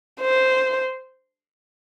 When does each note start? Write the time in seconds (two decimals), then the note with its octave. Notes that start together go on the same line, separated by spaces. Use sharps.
0.21 C5